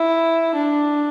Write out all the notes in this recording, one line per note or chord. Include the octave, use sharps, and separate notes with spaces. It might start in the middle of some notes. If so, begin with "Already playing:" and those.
Already playing: E4
D4